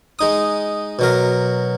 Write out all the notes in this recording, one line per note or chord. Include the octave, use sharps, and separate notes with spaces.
G#3 D#4 D#6
B2 F#3 A#4